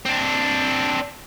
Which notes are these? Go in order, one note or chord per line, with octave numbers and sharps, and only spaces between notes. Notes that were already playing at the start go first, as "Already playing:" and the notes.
C4 D4